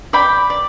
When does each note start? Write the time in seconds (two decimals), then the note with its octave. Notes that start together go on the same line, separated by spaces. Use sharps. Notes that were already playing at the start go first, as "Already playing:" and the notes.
0.13 D5 G5 B5
0.50 D5